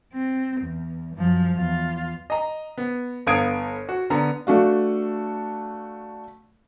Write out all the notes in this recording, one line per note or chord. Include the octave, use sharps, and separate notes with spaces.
C4
E2
F#2 F3
E2 F4
D#5 A#5
B3
G1 B3 F5 D#6 G#6 D7
F#4
D3 B3 A#5
A3 D4 F#4 F5